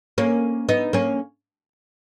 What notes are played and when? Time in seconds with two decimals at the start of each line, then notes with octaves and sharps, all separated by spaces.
0.18 A#3 C#4
0.69 B3 D#4
0.93 A#3 C#4